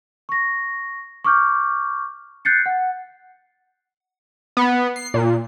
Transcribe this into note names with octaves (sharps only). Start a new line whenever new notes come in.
C#6 A#6
C#6 D6 F6 G6
F#6 G6 A6 C7 C#7
F#5
B3
C7
A#2